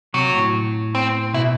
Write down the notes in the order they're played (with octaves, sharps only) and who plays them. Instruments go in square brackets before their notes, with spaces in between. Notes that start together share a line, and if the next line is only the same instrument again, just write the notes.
[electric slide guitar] C3 [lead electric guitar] F#3
[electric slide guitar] A2
[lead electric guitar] C4
[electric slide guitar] B2 [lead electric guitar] E4